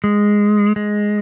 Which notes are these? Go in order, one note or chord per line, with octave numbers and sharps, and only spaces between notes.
G#3
G#3